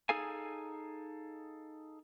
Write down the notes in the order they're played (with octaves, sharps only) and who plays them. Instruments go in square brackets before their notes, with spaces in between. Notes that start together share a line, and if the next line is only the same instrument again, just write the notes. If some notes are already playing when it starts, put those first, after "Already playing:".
[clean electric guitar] D#4 G#4 A4 F5 G#5